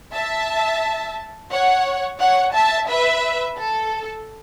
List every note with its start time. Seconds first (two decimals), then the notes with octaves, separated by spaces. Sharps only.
0.14 E5 A5
1.52 C#5 F#5
2.20 C#5 F#5
2.55 E5 A5
2.89 B4 E5
3.58 A4